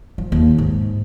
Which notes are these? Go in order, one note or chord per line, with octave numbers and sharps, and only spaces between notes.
F3
D#2
G#2